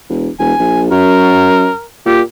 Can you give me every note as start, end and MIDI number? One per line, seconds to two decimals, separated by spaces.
0.10 0.29 28
0.39 0.53 28
0.39 0.82 80
0.60 0.91 34
0.91 1.69 42
0.91 1.83 70
2.06 2.22 46
2.06 2.21 67